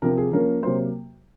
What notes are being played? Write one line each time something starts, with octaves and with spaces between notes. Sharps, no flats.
C3 F3 C4 A#4
G#4
F3 A#3 C#4 A#4
C3 F#3 A#3 C5